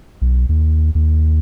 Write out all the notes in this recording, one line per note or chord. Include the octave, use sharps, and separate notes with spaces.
B1
D#2
D#2